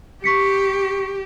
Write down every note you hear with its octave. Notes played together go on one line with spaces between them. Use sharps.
G4 C#6 B6 C#7